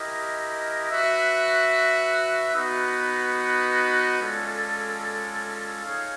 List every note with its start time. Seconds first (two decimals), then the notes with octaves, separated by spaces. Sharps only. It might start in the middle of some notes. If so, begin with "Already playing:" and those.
Already playing: E4 G4 A#4 D#5
0.91 F#4 B4 E5
2.55 B3 D#4 F#4 B4 D#5
4.21 G#3 C#4 F4 A4 D5
5.85 D#4 G#4 C#5 F5